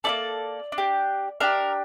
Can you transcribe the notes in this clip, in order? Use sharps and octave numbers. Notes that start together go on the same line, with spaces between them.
A#3 E4 A4 D5
D4
G4
D4 G4 A#4